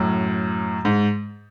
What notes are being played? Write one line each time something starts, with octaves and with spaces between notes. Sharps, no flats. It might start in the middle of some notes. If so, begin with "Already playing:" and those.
Already playing: F#2 A2
G#2